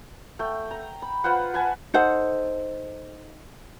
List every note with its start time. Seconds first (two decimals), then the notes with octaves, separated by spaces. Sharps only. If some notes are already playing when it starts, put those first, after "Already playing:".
0.39 A3 G5
0.71 A#5
1.02 B5
1.24 F4 B4 C5 F#5
1.54 B4 F#5 G#5 A5
1.94 D#4 A4 C5 F#5